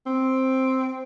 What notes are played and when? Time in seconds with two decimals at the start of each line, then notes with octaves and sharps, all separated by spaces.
0.06 C4